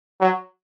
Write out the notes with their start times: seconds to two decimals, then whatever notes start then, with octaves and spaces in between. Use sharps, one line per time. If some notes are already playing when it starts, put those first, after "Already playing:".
0.20 F#3